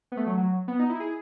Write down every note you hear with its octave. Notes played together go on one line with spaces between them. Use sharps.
B3
A3
F#3
F#3
B3
D#4
E4
G#4